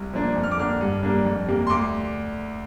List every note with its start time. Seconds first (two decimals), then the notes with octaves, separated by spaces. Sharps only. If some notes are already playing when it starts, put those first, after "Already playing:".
Already playing: C2
0.13 A#2 F3 A#3 D4
0.36 F2
0.43 F6
0.52 D6
0.57 D3 A#3 D4 F6
0.81 G2
1.03 G3 A#3 D4
1.25 F2
1.48 C3 G3 A#3
1.67 C6
1.70 D2 D6